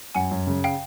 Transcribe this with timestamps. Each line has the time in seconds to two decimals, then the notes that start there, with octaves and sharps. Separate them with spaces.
0.15 F#2 F#5 G#5
0.31 F#2
0.47 C#3
0.64 F5 G5